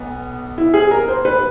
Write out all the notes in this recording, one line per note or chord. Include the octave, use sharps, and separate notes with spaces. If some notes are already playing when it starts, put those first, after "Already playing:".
Already playing: B1 B3
E4
G#4
A#4
C5
B4